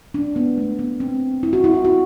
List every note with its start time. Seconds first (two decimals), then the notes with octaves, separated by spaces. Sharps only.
0.14 D4
0.36 B3
0.57 A3
0.79 B3
1.00 C4
1.43 E4
1.53 F#4
1.64 E4
1.74 E4
1.85 F#4